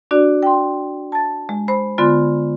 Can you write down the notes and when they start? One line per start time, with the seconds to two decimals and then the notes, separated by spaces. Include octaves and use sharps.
0.11 D4 F#4 D5
0.43 G5 C6
1.12 A5 A6
1.49 G#3
1.68 C5 B5
1.98 D3 G#3 B3 F4 C6 A6